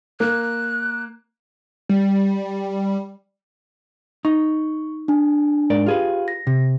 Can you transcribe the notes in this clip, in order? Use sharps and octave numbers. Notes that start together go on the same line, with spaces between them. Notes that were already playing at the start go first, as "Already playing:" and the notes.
A#3 F#6
G3
D#4 C#6
D4 G#5
G#2 A#4 D5
F4 G4 G#4 B4 F5
A#6
C3